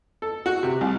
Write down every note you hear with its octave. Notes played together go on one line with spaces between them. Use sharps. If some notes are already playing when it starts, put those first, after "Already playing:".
A4
F#4
C3
C2